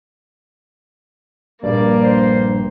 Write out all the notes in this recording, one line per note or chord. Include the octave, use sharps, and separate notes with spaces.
A#1 G2 A#3 D5
C5